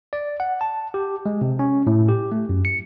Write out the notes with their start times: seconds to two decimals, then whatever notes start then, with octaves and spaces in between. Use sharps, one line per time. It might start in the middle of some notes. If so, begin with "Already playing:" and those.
0.13 D5
0.40 F#5
0.61 A5
0.94 G4
1.26 G#3
1.41 C3
1.59 C#4
1.87 A2
2.09 G4
2.32 A3
2.49 F#2
2.65 C#7